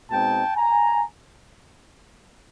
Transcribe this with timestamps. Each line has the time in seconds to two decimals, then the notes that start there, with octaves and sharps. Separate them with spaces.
0.10 B2 G#3 C4 D#4 G5 A5
0.56 G#5 A#5